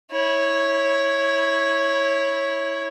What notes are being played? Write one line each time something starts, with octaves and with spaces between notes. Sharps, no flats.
E4 C#5